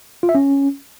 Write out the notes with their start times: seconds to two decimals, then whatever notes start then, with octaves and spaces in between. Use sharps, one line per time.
0.23 F4
0.29 E5
0.35 C#4